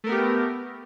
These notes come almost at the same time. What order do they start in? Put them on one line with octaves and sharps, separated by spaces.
A3 A#4 B3 G4